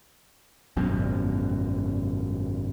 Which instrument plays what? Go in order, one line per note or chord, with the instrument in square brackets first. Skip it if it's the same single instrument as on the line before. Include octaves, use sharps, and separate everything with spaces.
[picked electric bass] G#1 F#2 B2